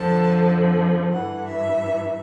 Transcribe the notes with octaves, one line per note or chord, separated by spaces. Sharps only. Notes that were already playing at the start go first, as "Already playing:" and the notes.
Already playing: F2 D3 F3 A5
G2 E3 F#5
E5